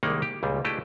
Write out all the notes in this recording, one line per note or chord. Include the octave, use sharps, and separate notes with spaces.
C2 D#3 G3 G#3 A#3 F#5
G4
C#2 A#2 G3
A3 D4 E4 G4 D#5